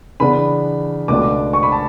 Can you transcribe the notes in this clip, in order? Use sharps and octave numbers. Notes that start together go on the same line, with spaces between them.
C#3 E3 B3 D4 B5
C#2 B2 A3 D4 D6
C#6
B5
A5